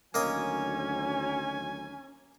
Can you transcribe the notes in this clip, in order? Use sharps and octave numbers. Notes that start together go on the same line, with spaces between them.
D2 D#3 F#3 A#3 C#4 D#5 G#5 D#6